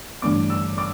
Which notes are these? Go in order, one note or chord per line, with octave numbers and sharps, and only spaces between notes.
A1 G2 D3 A3 D6
E6
D6